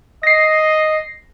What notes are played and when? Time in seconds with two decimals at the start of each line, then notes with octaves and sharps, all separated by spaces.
0.23 D#5 A#6 C7